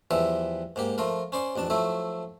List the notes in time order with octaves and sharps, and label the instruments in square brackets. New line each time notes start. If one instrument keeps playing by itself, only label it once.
[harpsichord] E2 E3 F3 G3 E5
G#2 A#3 G4
F3 A3 F4 A#4
C#4 C5 D5
A1 F2 D4 A5
F3 F#3 A3 E4 A4